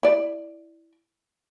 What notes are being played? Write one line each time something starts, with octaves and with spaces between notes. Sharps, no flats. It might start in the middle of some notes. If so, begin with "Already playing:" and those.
E4 D5